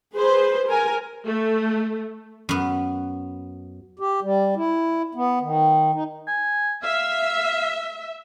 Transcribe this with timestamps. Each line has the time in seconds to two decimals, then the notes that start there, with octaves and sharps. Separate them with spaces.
0.15 G#4 B4 C5
0.68 A#4 G#5
1.26 A3
2.49 F#2 B3
3.99 G4
4.22 G3
4.56 E4
5.15 B3
5.41 D#3
5.94 D#4
6.28 G#5
6.83 E5 F5